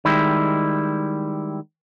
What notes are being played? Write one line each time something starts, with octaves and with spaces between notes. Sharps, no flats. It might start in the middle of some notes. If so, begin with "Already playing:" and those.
D#3 G3 G#3 E4